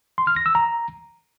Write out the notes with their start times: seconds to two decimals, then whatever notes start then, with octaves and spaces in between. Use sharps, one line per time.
0.18 C6
0.27 F6
0.36 A#6
0.46 E6
0.55 A#5